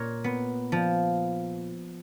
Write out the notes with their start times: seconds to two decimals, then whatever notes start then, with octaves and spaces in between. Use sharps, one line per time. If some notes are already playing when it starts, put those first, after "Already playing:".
Already playing: A#2 A#4 C#5
0.24 B3
0.72 F3